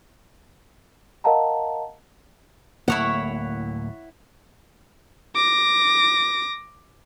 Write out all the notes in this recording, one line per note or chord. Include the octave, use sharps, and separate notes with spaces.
A#4 D#5 F5 F#5 A5 A#5
D1 A2 A#3 E4 C#5 F#5
D6 A#6